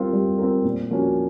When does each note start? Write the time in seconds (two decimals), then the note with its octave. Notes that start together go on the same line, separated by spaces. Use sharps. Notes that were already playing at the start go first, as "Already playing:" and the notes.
Already playing: G3 C4 F4 A#4
0.13 G3
0.38 C4 F4 A#4
0.64 A#2
0.90 F3 A#3 C#4 F#4